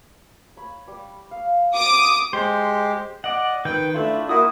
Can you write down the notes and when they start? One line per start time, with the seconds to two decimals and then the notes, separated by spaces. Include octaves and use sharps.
0.57 C#5 B5
0.88 G3 D6
1.31 F5
1.74 F#4 D6 D#6
2.33 G#3 G4 C5
3.24 D5 D#5 F#5
3.65 D#3 B4 G5 G6
3.94 A3 D4 E4 F4
4.29 A#3 E4 F#4 D#6